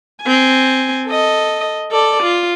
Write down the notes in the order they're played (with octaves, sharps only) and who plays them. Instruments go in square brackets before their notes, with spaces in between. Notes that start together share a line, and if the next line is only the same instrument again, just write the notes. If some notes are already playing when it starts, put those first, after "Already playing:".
[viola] C4 G#5
A4 D#5
A4 D5
F4